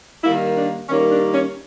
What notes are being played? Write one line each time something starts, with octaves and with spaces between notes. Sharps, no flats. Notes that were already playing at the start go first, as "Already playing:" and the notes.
D#3 G3 A#3 E4
D4
D#3 G3 A#3 C#4
D4
C#4